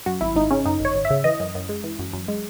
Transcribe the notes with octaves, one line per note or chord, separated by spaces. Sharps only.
F#2 F#4
G#1 E4
G#1 D#4
C#3 C#4
F#2 D#4
G#1 C#5
G#1
E5
C#3
E3 D#5
F#2
F#2
G#3
E3
F#2
F#2
G#3